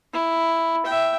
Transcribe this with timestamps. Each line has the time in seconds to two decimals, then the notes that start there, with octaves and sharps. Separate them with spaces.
0.13 E4
0.86 E5 G5